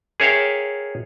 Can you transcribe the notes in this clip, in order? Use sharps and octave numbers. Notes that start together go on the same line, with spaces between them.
G#4 A#4 C#5 E5 F5 G5